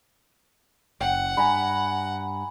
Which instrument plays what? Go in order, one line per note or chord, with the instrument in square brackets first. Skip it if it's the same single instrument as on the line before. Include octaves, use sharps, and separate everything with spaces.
[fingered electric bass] F#1 [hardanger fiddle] F#5 [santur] G5
[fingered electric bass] G2 [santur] G#5 A#5 B5